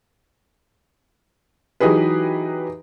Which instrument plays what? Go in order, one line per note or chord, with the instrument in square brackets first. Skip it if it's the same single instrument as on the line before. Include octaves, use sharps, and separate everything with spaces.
[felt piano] E3 F#3 D#4 G4 G#4 B4